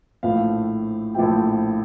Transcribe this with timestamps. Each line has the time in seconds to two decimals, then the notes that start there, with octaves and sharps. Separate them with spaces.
0.23 A#1 A2 F3 A3 F5
1.14 A#1 A2 F3 A3 G5